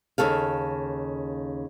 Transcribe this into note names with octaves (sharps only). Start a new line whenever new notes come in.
D#2 C#3 A4 F5